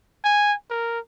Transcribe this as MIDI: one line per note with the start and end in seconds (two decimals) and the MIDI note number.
0.25 0.54 80
0.70 0.99 70